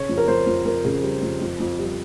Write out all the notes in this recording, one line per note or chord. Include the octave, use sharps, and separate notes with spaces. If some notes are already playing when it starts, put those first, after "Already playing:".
Already playing: C#3 C#5
F2
A#4
F2 C5
F2
F2 A#4
C#3
G3
F2
F2
F2
G3